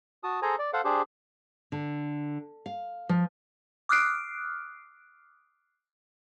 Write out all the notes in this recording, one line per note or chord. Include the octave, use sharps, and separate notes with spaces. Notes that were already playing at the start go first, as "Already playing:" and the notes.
F#4 A5 D#6
G#4 A4 C5 G#5 A#5
D5
A4 C5 F5 F#5
D4 G4 G#4 C5
D3
F5
F3
D6 D#6 F6 F#6 C7 D7